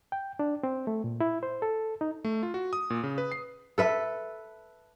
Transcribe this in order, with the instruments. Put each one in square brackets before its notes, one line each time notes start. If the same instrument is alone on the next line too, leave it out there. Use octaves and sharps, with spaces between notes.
[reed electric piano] G5
D4
C4
A3
A#2
E4
C5
A4
D#4
[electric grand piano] A3
F4
F#4
D#6
A#2
C#3
B4
C7
[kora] A4 B4 E5